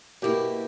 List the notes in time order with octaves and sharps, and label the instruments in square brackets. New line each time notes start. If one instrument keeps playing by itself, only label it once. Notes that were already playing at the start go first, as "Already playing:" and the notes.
[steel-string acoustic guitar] B2 A#3 E4 [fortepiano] G4